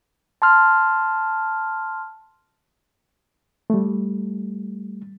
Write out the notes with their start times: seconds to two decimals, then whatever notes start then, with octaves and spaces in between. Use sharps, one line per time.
0.42 A5 C6 F6
3.70 G3 A3